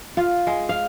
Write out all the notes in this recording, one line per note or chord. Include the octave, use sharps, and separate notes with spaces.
F4
G#3
F5